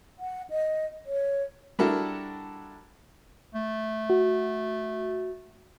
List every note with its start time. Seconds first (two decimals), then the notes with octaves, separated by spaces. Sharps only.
0.19 F#5
0.50 D#5
1.06 C#5
1.79 G3 D4 E4 F#4 A4 A#4
3.54 A3
4.10 F#4